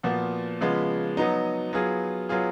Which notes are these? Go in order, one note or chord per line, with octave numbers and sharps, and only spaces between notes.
A#2 F3 B3 F#4
C#3 F3 G#3 B3
F#3 B3 D#4
F#3 B3 F4 G#4
F#3 B3 F4 G#4